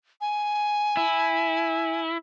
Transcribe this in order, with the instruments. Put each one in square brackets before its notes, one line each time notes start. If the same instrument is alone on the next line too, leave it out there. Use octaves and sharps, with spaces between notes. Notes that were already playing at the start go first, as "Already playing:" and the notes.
[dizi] G#5
[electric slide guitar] E4